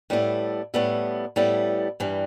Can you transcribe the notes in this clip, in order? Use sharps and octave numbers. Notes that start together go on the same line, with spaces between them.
A2 G3 B3 E4 A4
A2 G3 B3 E4 A4
A2 G3 B3 E4 A4
G2 E3 G3